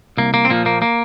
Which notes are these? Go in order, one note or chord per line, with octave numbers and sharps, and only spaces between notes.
C2 A#3
A#3
C4
A#2 F3 A#3
A#3
A#3